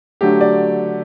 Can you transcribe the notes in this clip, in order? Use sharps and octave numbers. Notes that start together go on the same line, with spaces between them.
D3 F#3 A3 G4
D5